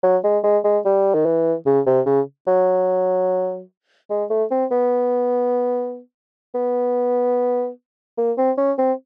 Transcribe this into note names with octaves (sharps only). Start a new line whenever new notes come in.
F#3
G#3
G#3
G#3
G3
D#3
E3
C#3
C3
C#3
F#3
G#3
A3
C4
B3
B3
A#3
C4
C#4
C4